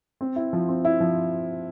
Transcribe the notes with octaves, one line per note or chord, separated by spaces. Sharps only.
C4
E4
F3
C4
E4
F3